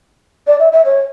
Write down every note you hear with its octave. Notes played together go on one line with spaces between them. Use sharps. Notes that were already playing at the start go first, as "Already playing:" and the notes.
D5
E5
E5
C#5